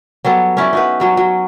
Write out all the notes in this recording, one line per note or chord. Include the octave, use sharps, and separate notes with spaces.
F#3 G3 B3 A4
C#4 E4 F#4 D5
D#4 F#4 B4
G2 F#3 C#4
F#3